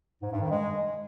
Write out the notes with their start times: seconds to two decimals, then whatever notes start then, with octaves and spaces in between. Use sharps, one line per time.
0.21 G#2
0.31 G2
0.41 D#3
0.50 G#3